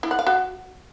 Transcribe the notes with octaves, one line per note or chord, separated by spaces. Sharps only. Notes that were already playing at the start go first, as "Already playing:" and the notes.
E4
F#5
F5
F#4